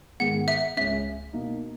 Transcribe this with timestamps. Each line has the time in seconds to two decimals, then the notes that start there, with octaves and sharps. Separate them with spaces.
0.20 G#2 D#3 G#3 B3 F#5
0.48 E5
0.77 C#2 C#3 G#3 C#4 E5
1.33 B2 A#3 D#4